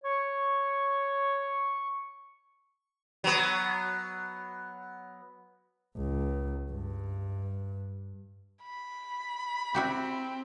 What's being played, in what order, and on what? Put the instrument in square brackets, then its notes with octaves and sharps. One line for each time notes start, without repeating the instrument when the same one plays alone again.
[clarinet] C#5 [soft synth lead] C#6
[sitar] F#3 B3
[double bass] C#2
G2
[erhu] B5
[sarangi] C4 [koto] E4 F#4 G4